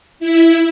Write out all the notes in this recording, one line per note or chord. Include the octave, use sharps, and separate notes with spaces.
E4